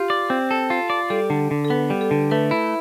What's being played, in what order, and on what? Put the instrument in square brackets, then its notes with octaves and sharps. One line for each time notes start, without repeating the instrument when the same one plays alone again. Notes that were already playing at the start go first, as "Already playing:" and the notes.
Already playing: [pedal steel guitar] F4 [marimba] G4
[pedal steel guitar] D5
C4
A4
F4
D5
[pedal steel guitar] G3 [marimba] A4
[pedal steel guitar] D3
D3
[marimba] A4
[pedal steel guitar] B3 [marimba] B4
[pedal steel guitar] G3
[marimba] A4
[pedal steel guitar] D3
[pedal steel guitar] A3 [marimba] B4
[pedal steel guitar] E4